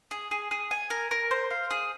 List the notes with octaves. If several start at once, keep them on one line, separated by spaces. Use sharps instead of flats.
G#4
G#4
G#4
G#5
A#4
A#4
C5
F5
G#4